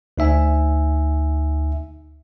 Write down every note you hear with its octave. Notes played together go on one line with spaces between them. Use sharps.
D2 D#4 E5 G#5